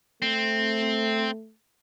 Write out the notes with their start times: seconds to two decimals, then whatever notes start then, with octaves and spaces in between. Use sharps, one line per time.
0.22 A3 C4